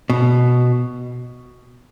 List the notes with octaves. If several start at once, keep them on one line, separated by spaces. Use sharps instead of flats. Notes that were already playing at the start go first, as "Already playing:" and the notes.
B2